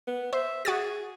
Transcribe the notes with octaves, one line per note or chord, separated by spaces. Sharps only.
B3
C5 E5
F#4 G#4 D#6 A6